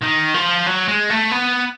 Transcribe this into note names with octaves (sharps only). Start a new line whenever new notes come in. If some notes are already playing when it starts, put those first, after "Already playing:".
D#3
F3
F#3
G#3
A3
B3